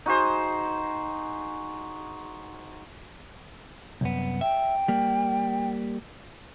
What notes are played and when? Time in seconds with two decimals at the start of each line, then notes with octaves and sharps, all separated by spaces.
0.06 D#4 F#4 G#4 C5
4.01 C2 F#2 B3
4.41 E5 G5
4.88 G3 A#3